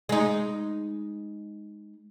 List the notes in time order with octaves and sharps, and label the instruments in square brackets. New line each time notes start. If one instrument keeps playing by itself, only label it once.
[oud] G#3 D#4